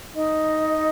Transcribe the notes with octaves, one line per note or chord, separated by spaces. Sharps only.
D#4 D#5